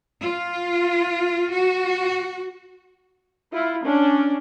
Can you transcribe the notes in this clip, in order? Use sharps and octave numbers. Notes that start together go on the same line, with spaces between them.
F4
F#4
E4 F4
C#4 D4